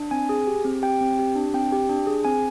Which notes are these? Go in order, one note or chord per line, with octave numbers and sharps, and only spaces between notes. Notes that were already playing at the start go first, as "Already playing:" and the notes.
Already playing: D4
C4 G#5
G#4
G4
C4
G4 G5
C4
G4
D4
C4 G5
G4
D4
G#4
C4 G#5